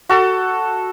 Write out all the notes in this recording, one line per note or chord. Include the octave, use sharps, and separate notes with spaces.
F#4 A4